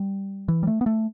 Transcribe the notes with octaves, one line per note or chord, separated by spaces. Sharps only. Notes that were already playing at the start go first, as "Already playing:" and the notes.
Already playing: G3
E3
G3
A3
B3
A3